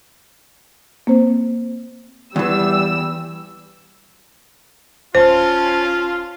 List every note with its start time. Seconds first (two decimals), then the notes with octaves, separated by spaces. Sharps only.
1.07 A#3 C4 C5
2.36 E2 E3 G3 E6
5.15 D1 C#4 F4 C5 A5